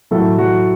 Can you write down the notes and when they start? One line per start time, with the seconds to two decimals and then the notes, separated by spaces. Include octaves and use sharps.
0.11 A2 F#3 A3 A4
0.38 F#3 F#4